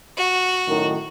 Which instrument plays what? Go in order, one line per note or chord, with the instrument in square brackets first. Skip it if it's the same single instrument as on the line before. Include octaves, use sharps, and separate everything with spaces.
[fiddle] F#4
[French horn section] F#2 A2 D#3